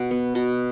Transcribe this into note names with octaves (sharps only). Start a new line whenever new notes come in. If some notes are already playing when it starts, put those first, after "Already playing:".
Already playing: B2 F#5
B3
B2